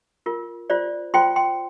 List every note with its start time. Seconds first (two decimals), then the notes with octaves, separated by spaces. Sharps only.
0.26 F4 A#4
0.70 F4 C5 D5
1.14 F4 C5 G5 C6
1.36 G5 C6